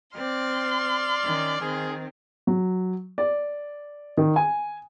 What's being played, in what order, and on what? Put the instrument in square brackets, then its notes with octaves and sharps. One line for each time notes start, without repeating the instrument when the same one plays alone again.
[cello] C4 [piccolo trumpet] D5 [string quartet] C6 F6
[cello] D#3 C#4
[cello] D#3 C4 [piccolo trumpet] G#4
[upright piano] F#3
D5
D#3
G#5